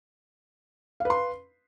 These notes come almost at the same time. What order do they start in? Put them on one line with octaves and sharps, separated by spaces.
F5 B4 C6